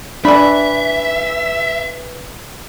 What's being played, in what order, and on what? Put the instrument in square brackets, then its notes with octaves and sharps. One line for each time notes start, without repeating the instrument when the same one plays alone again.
[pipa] E3 B5 [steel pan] D4 [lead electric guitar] E5